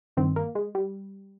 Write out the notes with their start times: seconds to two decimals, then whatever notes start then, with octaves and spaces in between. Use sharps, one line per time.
0.17 G1 G2 D#3 C4
0.36 A#3
0.55 G#3
0.75 G3